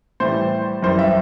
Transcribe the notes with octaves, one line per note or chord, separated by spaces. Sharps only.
A2 E3 G3 C5
F#2 E3 G3 C5
E5